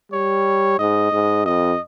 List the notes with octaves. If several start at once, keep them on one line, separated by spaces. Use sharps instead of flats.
G3 C#5
G#2 D#5
G#2
F2 D#5